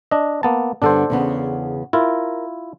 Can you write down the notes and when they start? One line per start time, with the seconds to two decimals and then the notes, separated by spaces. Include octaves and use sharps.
0.11 D4 D#5
0.43 A#3 B3 A5
0.82 G2 D3 B3 D4 A4 C5
1.10 E2 C#3 B3
1.93 E4 F4 A#4